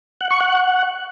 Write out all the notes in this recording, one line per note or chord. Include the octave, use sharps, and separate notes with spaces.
F#5
C#6
F#5